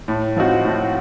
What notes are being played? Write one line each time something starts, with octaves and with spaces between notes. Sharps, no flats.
A2
F3 C4 D#4 F#4
A2